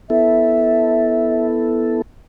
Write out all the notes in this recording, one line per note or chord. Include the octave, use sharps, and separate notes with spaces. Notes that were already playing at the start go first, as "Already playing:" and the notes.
B3 E4 A4 E5